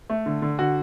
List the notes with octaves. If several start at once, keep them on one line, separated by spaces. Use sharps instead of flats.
A3
D3
D3
D3 F#4